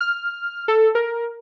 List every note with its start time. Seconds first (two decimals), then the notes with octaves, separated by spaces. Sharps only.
0.01 F6
0.68 A4
0.95 A#4